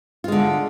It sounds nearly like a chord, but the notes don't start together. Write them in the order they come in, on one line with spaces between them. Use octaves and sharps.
F4 G#3 D3